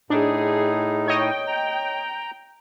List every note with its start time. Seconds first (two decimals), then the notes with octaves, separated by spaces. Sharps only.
0.10 A2 D4 D#4 G#4
1.08 C#5 D#5 G5
1.47 A#5